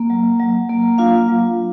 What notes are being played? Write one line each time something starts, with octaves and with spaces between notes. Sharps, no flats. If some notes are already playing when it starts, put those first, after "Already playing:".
Already playing: A#3
F#3
F#3
A#3
D4 F4 F5
F#3